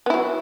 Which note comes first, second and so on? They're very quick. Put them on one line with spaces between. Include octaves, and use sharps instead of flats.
B3 E4 F#3